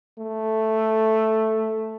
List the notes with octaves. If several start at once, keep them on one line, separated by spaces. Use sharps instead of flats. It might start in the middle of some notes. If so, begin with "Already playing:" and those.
A3